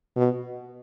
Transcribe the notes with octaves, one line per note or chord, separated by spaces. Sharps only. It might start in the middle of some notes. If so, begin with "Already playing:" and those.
B2